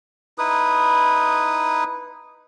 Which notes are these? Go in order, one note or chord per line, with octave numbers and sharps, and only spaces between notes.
D#4 E4 B4 D#6